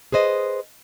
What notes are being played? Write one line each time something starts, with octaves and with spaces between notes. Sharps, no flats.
G#4 B4 C5 D#5